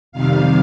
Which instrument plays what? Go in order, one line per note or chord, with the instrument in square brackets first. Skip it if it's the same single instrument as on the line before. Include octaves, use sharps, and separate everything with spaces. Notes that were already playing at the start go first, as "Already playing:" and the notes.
[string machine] F2 C3 D#3 G3 F5